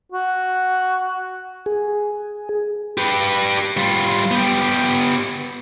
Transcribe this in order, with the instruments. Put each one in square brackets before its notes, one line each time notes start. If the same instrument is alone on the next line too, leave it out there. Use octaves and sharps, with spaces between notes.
[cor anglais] F#4
[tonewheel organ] G#4
[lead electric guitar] G4 B4
G3 F4
B3 G4